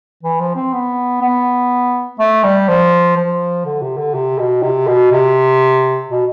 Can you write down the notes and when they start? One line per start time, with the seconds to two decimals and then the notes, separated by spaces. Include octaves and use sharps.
0.23 E3
0.40 F3
0.55 C4
0.73 B3
1.21 B3
2.19 A3
2.44 G3
2.68 F3
3.17 F3
3.65 D3
3.82 C3
3.97 D3
4.14 C3
4.39 B2
4.62 C3
4.87 B2
5.12 C3
6.10 B2